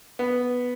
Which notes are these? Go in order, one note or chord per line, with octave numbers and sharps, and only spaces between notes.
B3